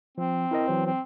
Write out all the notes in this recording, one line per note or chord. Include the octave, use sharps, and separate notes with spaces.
F3 C4
E4 A#4 D#5
E3 F#3 C5
C4